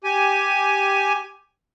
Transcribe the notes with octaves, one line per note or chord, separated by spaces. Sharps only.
G4 G#5